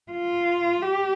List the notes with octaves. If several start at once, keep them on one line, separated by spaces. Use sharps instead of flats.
F4
G4